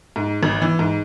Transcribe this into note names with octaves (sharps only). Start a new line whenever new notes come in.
G#2
G#1
E3
G#2